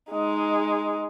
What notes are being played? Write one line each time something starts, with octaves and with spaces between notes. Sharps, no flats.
G#3 D#4